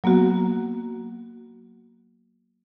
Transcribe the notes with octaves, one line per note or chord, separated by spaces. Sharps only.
F#3 A#3 B3 F#4